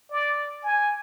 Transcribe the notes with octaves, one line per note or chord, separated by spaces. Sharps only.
D5
G#5